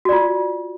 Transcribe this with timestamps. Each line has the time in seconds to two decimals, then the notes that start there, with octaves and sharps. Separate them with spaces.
0.05 F#4
0.09 D5
0.12 F4